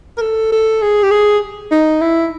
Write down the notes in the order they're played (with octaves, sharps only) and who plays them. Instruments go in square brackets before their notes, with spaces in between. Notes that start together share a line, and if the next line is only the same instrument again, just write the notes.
[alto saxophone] A#4
A4
A4
G#4
G4
G#4
D#4
E4